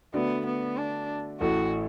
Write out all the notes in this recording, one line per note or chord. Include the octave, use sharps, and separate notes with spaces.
D3 A3 B3 F#4 D5
B3
D4
A1 A2 A3 E4 F#4 A4